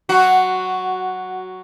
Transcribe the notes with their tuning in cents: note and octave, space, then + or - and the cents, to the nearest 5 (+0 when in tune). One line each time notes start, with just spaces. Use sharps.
F#3 +10 F#4 +0